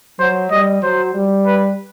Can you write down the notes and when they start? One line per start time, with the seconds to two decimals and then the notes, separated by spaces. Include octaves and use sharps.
0.19 F#3 C5
0.51 G3 D#5
0.82 F#3 C5
1.14 G3
1.46 B4